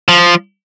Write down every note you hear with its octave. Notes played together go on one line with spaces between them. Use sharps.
F3